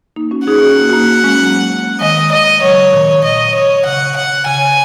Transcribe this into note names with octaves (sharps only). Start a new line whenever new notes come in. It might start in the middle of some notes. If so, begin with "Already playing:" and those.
A#3 D#4
C#4 F#4
D#4 G#4 F#5
C#4 F#4
A#3 D#4
F#4
A#3 D#4
G#3 C#4
F#3 A#3
D#3 G#3 D#5
D#5
C#3 F#3 C#5
A#2 D#3
D#5
C#5
C#3 F#5
F#5
C#3 G#5